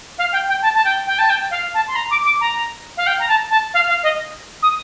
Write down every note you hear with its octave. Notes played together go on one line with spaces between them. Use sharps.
F5
G5
G5
A5
A5
G5
G5
A5
G5
F5
A5
C6
A#5
D6
D6
A#5
F5
G5
A#5
A5
A5
F5
F5
D#5
D#6